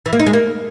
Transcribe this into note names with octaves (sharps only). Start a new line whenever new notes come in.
E3
A#3
D#4
G#3
A#3